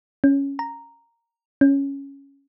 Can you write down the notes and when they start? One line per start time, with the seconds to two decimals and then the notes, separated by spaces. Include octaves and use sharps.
0.24 C#4
0.59 A#5
1.61 C#4